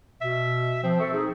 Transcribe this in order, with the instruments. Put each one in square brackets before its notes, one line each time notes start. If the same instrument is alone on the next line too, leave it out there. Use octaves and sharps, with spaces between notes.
[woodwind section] B2 [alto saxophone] E5
[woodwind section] F3 [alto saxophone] C4
[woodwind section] A4 E5 C#6
D#4 G#4